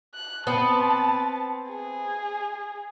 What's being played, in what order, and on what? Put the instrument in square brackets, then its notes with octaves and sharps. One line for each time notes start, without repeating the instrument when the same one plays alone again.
[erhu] F#6
[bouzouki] B3 C4 [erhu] A5
[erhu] G#4